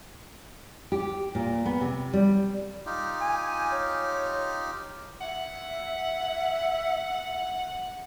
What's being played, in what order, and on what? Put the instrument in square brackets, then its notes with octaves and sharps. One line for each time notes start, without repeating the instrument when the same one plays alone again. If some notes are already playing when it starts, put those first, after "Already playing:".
[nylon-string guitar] G4
A#2
B3
C3
G3
[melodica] D#4 F4 G4
[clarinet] G#5
C#5
[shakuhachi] E5 [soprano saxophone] F#5